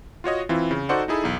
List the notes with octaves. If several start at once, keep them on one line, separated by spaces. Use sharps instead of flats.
F4 F#4 C#5 D#5
E3 C4 E4 F4
C#3
D#4 F#4 A4 C5 D5 F#5
D#4 E4 G#4 A4 B5
B1 E2